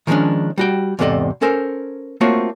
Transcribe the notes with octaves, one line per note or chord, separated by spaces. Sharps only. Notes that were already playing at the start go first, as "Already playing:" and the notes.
D#3 F3 G#3 A3 C#4 D4
G3 F#4 G5
E2 G#2 C3 A4 D5 D#5
C#4 A4 A#4 C5
A3 A#3 C4 F4 F#4 C#5